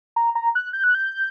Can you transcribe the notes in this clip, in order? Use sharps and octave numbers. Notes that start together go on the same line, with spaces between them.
A#5
A#5
F#6
G6
F#6
G6